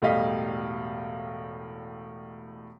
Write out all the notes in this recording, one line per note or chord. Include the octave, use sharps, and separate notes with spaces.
E1 A2 G3 D#5 F5 B6